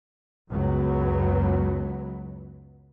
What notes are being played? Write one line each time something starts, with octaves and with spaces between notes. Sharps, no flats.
C#2 F#2 F#3 B3